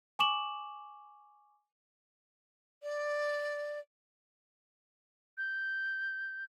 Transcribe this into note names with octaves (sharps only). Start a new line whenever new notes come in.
G#5 C#6 D6 E7 F#7
D5
G6